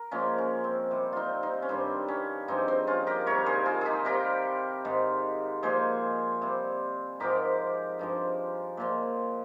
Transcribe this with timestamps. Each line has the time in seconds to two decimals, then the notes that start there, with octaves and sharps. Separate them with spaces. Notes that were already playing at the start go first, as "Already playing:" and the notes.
Already playing: A#4
0.11 A#2 F3 G#3 C#4
0.38 C#4
0.64 C4
0.91 C3 G3
1.13 C4 D#4 F4
1.43 C4 D#4
1.62 C#4
1.69 G2 D#3 G3 C4
2.08 C#4
2.48 G2 F3 G#3 C4 D#4
2.68 C4
2.87 C#4 F4
3.07 G4 A#4
3.26 C3 D#3 G3 A#4 C#5
3.46 G#4 C5
3.66 F4 G#4
3.81 D#4 G4 G#4
4.05 C3 G3 G4 A#4
4.85 G#2 D#3 G#3
5.63 A#2 F3 G#3 G#4 C5
6.42 C3 G3
7.20 G#2 F3 G#3 G4 A#4
7.99 G2 F3 G#3
8.77 A#2 F3 G#3